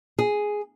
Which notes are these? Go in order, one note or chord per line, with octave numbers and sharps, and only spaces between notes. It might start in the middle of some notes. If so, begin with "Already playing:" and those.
G#4